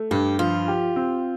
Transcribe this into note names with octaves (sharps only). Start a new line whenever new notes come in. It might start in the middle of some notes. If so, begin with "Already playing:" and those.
Already playing: A3
G2 G4
F3 F4
G4
C4